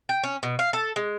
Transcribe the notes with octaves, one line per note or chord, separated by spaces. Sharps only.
G5
C#4
B2
F5
A4
G#3